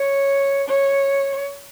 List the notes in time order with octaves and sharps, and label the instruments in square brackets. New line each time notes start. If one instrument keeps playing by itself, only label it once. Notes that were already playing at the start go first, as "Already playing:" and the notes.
Already playing: [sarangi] C#5
C#5